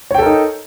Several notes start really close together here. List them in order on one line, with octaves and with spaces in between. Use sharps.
C#5 G5 A4 A#4 D#4